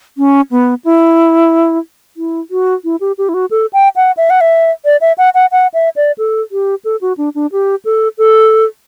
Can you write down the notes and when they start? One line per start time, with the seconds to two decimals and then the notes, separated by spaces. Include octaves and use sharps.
0.18 C#4
0.51 B3
0.85 E4
2.17 E4
2.51 F#4
2.84 E4
3.01 G4
3.18 G4
3.29 E4
3.34 F#4
3.51 A4
3.73 G5
3.96 F#5
4.17 E5
4.30 F#5
4.41 E5
4.85 D5
5.01 E5
5.18 F#5
5.34 F#5
5.52 F#5
5.74 E5
5.96 D5
6.18 A4
6.52 G4
6.85 A4
7.01 F#4
7.18 D4
7.35 D4
7.52 G4
7.85 A4
8.18 A4